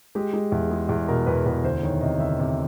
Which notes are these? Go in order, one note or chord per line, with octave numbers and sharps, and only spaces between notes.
G#3 G4
G#3
E2
G#3
E2 G#4
B2 A#4
E2 B4
E2 B4
D2 C5
D#3 C#5
C3 D#5
D2 E5
C3